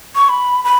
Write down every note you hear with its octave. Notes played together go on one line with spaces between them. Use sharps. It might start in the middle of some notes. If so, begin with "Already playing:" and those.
C#6
B5
B5